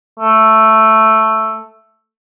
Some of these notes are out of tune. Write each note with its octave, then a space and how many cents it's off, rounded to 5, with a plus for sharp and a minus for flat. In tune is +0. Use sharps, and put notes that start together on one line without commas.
A3 +5